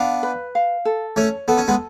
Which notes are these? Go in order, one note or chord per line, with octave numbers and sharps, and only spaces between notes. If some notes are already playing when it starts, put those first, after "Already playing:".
Already playing: B3 D4 F5
B4
F5
A4
A3 C#4 C#5
B3 A4
C#4
G#3 B3